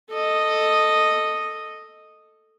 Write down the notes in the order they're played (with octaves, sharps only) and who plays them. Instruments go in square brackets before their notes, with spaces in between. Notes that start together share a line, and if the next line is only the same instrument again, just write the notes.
[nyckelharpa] A4 D#5